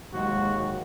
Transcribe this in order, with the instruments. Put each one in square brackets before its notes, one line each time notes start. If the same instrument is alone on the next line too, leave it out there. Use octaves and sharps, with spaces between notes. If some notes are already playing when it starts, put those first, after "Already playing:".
[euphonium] D#2 [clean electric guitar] G#2 F#3 G#3 [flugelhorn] F#4